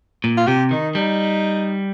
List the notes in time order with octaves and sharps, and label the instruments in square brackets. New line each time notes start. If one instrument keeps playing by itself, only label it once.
[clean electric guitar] A#2
[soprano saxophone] F4
[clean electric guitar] C3 [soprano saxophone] G4
[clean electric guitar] D#3 [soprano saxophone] D#4
[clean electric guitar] G3 [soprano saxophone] D#4